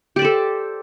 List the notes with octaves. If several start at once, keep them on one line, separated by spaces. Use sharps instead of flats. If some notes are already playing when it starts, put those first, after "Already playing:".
G4 A4 C5 D5